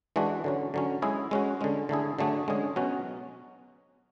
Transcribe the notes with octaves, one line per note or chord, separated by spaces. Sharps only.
E3 G#3 D4 F#4
D3 F#3 C#4
D3 F#3 C#4
G#3 C#4 E4 G#4
G#3 C#4 F#4
D3 G#3 C#4
D3 A3 E4 G#4
D3 F#3 A3 D4 G#4
D3 G#3 C#4 G#4
B2 F#3 C#4 F#4